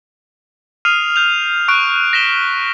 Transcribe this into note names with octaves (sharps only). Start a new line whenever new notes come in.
D#6 F6 C7 D#7 F7
G6 F7
C#6 F#6 D7
A#6 B6 E7 G7